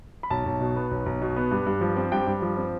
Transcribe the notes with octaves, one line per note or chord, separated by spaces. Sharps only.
B5
B1 A5
B1
B2
B3
B1
B1
B2
B3
G2
G2
F3
C4
G2 G5
G2
F3
C4